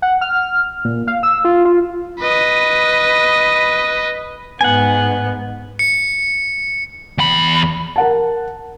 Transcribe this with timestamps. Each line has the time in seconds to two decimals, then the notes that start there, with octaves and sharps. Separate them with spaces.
0.02 F#5
0.21 F6
0.85 A#2
1.07 F5
1.23 E6
1.45 F4
1.65 F4
2.20 B4 D#5
4.61 G#2 B3 F#5 G#5
5.79 C#7
7.18 E2 B5
7.96 A#4 F#5 A5